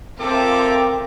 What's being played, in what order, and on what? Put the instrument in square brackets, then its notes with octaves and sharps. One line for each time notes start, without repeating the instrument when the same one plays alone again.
[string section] C4 F4 [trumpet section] A4 E5 D6 [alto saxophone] A#4 [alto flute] G5